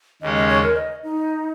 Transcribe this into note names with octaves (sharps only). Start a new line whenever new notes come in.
D#2 C#3 G#3 C#4 D#5
D#5
C#5
A#4
D#5
D#4